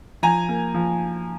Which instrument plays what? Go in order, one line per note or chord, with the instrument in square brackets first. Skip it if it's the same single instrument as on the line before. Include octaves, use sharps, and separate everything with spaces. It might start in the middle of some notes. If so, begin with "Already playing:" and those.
[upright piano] F3 G#5 A#5
A#3
F3